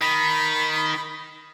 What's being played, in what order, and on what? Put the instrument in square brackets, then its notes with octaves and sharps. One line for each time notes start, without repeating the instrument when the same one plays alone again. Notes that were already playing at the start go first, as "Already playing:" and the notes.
[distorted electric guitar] D#3 [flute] B5